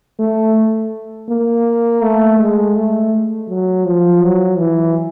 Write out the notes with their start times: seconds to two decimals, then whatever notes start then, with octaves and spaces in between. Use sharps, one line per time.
0.19 A3
1.29 A#3
2.02 A3
2.39 G#3
2.76 A3
3.48 F#3
3.85 F3
4.22 F#3
4.58 E3